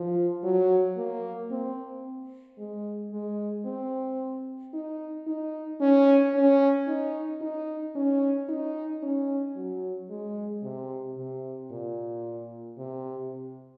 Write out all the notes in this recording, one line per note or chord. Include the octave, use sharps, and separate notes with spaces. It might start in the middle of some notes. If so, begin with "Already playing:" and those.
Already playing: F3
F#3
A#3
C4
G#3
G#3
C4
D#4
D#4
C#4
C#4
D#4
D#4
C#4
D#4
C#4
F#3
G#3
C3
C3
A#2
C3